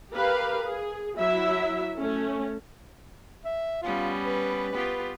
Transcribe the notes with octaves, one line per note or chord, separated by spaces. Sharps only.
G4 A#4 B4 F5
G#4
F#3 E4 E5
A3 C#4
E5
G3 B3 C#4 F4
B4
B3 F4 G4